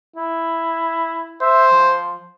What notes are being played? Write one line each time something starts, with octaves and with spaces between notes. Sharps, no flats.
E4
C5 E5
F3